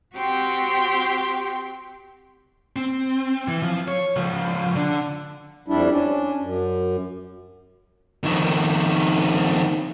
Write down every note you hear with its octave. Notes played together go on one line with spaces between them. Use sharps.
C4 F#4 G4 G5 C6
C4
E3
F3
C#5
C#2 F3
D3
F2 G3 D4 E4
C#4 D4
F#2
F2 D#3